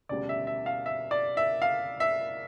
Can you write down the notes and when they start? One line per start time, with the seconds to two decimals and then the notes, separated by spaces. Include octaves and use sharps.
0.09 E1 D2 C#3 G3 D5
0.29 E5
0.47 E5
0.66 F5
0.86 E5
1.11 D5
1.37 E5
1.62 F5
2.00 E5